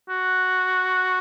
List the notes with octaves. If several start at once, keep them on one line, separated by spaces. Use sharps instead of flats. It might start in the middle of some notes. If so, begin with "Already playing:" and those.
F#4